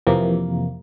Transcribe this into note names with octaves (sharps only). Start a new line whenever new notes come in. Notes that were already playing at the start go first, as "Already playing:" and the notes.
F2 C3 E3 A#3